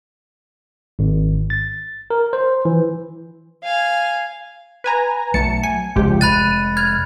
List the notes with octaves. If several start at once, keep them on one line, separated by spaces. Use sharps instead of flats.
G#1
A6
A#4
C5
E3
F5 G#5
B4 G#5 A#5
B1 F#3 A3 A5 C#7
G#5 C#7
F1 C#2 G2 F3 G#3 G4
F1 G#3 B5 F#6 A6 D#7
F6 G#6